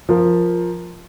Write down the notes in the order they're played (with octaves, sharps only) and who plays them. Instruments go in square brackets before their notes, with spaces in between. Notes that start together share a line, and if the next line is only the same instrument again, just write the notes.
[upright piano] F3 A#4